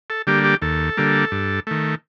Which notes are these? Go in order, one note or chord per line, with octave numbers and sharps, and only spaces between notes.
A4
D3 G3 A#3 G4
G4
D#2 A4
D3 G3 A#3
G2
D#3 A3